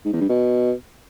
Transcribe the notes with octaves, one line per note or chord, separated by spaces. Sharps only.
G#2
E2
G2
B2